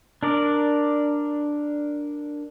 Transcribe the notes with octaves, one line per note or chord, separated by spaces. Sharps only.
D4 A#4 D5